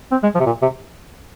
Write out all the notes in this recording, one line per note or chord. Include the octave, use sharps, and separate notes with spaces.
C4
G#3
F3
C3
A#2
C3